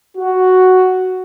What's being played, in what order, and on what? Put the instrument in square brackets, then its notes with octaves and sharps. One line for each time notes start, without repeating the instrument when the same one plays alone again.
[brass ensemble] F#4